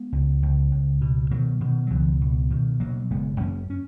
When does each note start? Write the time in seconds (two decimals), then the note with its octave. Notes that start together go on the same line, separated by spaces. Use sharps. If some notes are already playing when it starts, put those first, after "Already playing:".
Already playing: G#3 B3
0.12 C#2
0.42 C#2
0.72 C#2
1.01 B2
1.31 B2 D#3 F#3
1.60 B2 D#3
1.87 F#3
1.90 C#2 E3
2.21 B2
2.50 B2 D#3
2.80 B2 F#3 A#3
3.10 F#1 G#3 B3
3.41 F#2 A#3 C#4
3.70 C#4